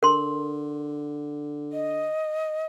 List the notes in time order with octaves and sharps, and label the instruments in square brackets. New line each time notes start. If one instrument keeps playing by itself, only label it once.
[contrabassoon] D3 [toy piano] A#4 C6
[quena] D#5